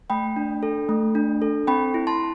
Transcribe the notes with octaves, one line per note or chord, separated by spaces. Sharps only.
A3 G5 B5
D4
A4
A3
D4
A4
C4 G5 B5
E4
A5 C6